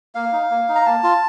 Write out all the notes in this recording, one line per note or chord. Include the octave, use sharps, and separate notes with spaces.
A#3 F5
D#4
A#3
D#4
A#5
A#3 A5
F4